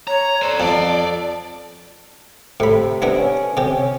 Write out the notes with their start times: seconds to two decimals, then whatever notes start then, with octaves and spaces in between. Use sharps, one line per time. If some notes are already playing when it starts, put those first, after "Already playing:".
0.08 C#5 A#5
0.41 A4 C5 D5
0.60 F2 D5 A5
2.60 A2 C3 B5
3.02 B3 D4 E4
3.18 C#4
3.57 C3 G4
3.76 C#4